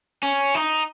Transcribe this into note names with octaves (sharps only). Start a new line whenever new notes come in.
C#4
D#4